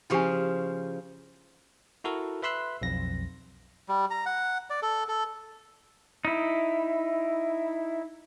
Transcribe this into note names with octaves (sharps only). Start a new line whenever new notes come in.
C#3 F3 E4 F4 G4 G#5
E4 F#4 A4 A#4
B4 E5 B5 C6 E6 F#6
B1 F2 A#6
G3
A#5
F#5
D5
A4
A4
D#4 E4